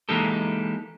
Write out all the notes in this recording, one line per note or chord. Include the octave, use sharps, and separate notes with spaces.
E3 G#3 A#3 D#4 G4 A4